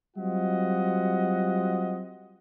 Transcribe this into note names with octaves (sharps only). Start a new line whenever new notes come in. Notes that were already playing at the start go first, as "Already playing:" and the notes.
F#3 G3 C4 F4 D#5 F#5